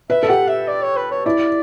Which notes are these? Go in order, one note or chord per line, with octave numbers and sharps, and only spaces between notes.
B4 E5
A4
G4 F#5
E5
D5
C#5
B4
C#5
E4 D5